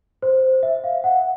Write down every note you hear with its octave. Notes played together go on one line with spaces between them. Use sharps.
C5
E5
F5
F#5